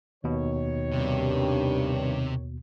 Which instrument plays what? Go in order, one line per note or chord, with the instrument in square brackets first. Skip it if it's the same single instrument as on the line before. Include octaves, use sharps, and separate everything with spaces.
[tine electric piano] D#2 B2 [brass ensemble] D#3 C#5
[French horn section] G2 [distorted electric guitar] C3